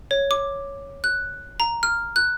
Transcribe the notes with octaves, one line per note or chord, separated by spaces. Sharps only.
C#5
D6
F#6
A#5
F6
F#6